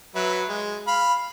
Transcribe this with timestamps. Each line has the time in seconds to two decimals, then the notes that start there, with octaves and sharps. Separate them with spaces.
0.15 F#3 B4 E5
0.49 G#3
0.88 F5 B5